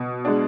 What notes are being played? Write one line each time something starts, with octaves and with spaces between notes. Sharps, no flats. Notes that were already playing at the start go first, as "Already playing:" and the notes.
Already playing: B2
G#3 D4